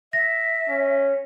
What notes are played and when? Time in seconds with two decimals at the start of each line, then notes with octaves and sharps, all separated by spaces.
0.13 E5 A#6
0.69 C#4